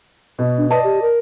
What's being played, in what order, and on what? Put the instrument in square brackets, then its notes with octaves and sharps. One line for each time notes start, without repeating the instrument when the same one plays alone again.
[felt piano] B2
[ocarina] D4
[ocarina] B4 [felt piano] D5 D#5 A5
[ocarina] G4
A#4